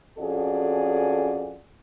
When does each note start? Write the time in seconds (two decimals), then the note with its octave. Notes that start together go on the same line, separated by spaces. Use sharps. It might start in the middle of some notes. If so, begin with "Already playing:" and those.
0.17 F2 C#4 F#4 G#4 A4 D5